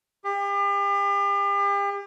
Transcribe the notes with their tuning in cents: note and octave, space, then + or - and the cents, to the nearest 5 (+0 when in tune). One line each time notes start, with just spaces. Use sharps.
G4 +40